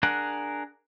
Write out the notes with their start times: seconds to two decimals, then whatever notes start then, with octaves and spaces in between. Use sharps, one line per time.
0.03 D4 G#4 A#4 F#5